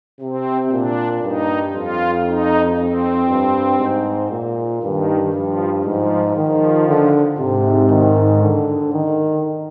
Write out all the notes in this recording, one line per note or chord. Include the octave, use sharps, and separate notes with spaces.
C3 C4
A#2 D4
G2 D#4
F2 F4
D#4
C4
G2
G#2
A#2
G2 D#3
G2 F3
G#2 F3
D#3 F3
D3
G#2 C3
D#3
D3
D#3